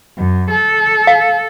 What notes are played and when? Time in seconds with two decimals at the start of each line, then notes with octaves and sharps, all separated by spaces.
0.18 F#2
0.51 A4
1.07 F5